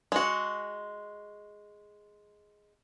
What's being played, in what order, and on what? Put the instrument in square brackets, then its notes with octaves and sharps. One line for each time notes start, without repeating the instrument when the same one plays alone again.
[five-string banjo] G#3 F#4